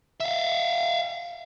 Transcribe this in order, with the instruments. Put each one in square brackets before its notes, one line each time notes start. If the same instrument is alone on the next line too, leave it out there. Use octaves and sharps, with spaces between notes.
[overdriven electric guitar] E5 F5